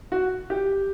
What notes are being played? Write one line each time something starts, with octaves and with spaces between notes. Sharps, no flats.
F#4
G4